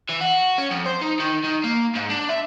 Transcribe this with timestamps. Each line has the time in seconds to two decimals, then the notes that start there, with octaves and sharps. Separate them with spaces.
0.09 E3
0.20 F#4
0.58 C#4
0.70 F2
0.86 C5
1.01 D#4
1.20 D#3
1.44 D#3
1.64 A#3
1.95 G#2
2.10 D4
2.29 E5